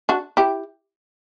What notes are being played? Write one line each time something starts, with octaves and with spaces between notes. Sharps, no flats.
D4 F#4
E4 G4